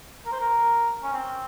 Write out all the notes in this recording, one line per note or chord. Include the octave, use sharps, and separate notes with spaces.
A#4
C5
A#4
C#4
C4